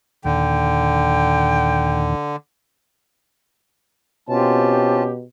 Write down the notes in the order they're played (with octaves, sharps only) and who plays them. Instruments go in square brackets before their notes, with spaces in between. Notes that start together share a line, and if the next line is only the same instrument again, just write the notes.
[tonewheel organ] D#2 A#2 D#3 [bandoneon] D3 [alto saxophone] G5
[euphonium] B2 [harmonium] C4 F4 A5 [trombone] C#4 [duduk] G4